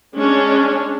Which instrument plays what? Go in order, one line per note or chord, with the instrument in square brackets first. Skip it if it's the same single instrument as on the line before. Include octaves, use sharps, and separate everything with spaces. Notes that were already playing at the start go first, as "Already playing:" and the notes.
[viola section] G#3 C#4 D4